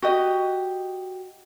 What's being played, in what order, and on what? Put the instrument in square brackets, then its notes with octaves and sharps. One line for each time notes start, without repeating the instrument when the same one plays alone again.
[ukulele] F#4 G4 D#5